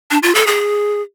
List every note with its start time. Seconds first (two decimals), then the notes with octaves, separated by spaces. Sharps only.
0.11 D4
0.23 F4
0.35 A4
0.47 G#4